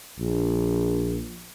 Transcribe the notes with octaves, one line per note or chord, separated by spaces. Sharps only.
A#1